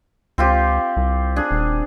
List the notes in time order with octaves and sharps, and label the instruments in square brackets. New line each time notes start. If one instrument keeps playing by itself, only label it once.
[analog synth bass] C#2 [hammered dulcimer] C4 F4 G4
[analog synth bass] C2
[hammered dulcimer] D4 G#4
[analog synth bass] D#1